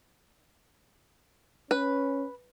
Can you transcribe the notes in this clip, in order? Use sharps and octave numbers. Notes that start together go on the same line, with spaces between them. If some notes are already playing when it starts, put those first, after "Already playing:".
C#4 B4